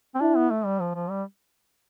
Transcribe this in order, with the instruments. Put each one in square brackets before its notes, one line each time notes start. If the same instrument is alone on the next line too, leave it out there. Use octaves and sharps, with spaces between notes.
[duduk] C4
[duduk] D4 [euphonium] E4
[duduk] B3
A3
G3
F3
F3
G3